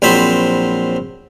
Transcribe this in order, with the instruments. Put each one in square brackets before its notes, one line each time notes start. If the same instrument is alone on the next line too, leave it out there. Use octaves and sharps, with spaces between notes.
[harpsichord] A#1 F#3 C4 C5 B5